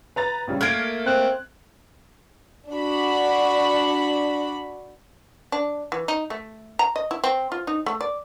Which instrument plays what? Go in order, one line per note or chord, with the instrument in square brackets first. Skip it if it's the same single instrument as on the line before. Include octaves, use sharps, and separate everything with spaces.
[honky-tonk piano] B4 A#5 A6
A#1 C#3 G3
[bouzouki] A3 A#3 [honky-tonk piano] F6 G#6 D7
[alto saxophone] C4 [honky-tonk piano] F#6
[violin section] D4 F#4 B5
[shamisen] D4
E3
D#4
A3
A#5
D#5
E4
C4
F4
D#4
A3
D5